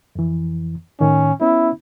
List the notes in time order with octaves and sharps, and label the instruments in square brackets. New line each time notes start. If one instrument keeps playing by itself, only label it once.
[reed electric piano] F2 E3
[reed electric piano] A2 D#3 [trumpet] C#4
[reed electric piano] B3 C#4 [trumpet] E4